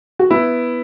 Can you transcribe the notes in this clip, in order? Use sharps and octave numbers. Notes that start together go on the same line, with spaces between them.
F#4
B3 E4